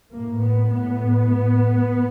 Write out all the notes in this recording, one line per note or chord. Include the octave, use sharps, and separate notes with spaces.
A2 A#3
B3
A2 B3
A2